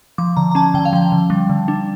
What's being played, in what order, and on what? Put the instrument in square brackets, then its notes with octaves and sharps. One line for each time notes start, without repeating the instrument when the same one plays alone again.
[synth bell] F3 D6
D3 A#5
A#5
C#4 A5
D3 G5
F5
F3 G5
D3
G3
D3
D4